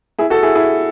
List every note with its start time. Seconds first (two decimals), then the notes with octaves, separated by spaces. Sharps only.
0.19 E4 G#4
0.30 F#4 A4
0.43 E4 G#4
0.55 E4 G#4